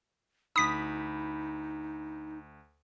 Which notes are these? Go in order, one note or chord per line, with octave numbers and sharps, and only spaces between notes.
D2 D#4 B5 D#6 B6